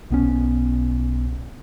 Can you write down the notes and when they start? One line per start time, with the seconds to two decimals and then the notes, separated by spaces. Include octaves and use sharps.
0.10 B1 B3 C#4